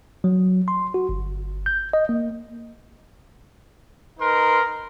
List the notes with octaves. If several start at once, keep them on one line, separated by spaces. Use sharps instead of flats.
F#3
C6
F#4
G1
G6
D#5
A#3
D#4 A#4 B4 C6